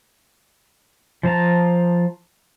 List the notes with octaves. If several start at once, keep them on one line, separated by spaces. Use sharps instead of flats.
F3 C5 A5 A#5